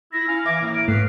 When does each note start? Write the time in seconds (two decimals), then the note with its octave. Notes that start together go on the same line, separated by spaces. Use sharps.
0.13 E4 A#6
0.28 C#4 F5
0.46 E3 E5 D6 G#6 A#6
0.61 A2 A#3
0.75 D7
0.88 G#2 A3 B4 F5 C7